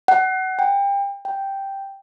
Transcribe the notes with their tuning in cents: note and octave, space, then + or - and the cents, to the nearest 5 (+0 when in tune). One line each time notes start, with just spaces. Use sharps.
F#5 +25
G5 +30
G5 +0